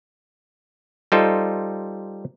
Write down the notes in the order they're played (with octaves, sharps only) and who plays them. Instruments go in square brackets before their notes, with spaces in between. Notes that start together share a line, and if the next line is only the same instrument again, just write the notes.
[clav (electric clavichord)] G3 D#4 F4 A4 C5 D#5